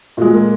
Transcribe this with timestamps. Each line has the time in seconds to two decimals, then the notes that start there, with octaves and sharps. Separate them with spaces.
0.17 A#2 G#3 F#4
0.34 A#4